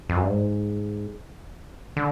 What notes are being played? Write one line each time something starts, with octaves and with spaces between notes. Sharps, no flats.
F2
F#2
G2
G#2
D3